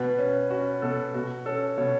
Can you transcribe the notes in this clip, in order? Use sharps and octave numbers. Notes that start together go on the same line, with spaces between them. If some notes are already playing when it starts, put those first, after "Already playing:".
Already playing: B2 B4
C#4
C#4 F#4
B2 A4
B2 F#4
C#4 A4
B2 C#5